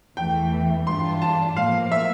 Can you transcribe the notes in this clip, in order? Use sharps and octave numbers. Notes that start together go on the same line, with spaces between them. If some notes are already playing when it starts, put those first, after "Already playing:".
E2 E3 A3 G5
G2 E3 G3 D4 F4 C6
A5
A2 F3 A#3 F5
E5